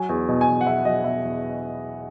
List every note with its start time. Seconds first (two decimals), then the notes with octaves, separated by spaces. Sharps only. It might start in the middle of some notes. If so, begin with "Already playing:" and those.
Already playing: F#3 G#5
0.09 E2
0.29 B2
0.41 G#5
0.48 E2
0.61 F#5
0.67 E2 E5
0.85 F#3 D#5
1.04 B2 E5
1.24 E2